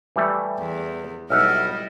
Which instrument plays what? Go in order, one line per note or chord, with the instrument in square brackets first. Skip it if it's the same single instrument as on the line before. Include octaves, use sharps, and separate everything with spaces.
[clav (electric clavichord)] E3 G3 A3
[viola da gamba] E2
[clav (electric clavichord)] B1 E5 F#5 [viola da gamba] G3 E4 D#5 [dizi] F6